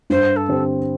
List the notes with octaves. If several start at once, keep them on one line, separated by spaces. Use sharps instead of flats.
G2 C5
A4
D3 C4 G4